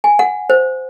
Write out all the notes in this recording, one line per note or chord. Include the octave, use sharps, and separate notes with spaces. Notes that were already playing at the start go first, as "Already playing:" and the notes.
G#5
F#5
C5